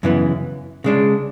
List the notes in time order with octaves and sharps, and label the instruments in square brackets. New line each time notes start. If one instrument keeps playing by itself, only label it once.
[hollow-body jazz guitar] F#2 C#3 E3 B3
C#3 G#3 D4